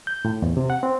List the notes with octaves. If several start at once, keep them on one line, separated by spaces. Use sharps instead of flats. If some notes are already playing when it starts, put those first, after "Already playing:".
G6
A2
E2
C3
F#5
C4